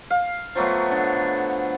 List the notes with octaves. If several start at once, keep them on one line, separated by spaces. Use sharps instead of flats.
F5
F3 F#3 A3 B3
D3